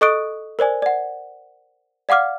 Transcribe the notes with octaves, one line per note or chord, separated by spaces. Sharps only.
A4 D#5 C#6 D#6 F#6 D7
A#4 C5 D5 G#5
D5 F#5
D5 F5 F#5 D6 F6